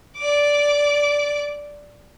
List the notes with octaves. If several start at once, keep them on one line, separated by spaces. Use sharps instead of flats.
D5 D6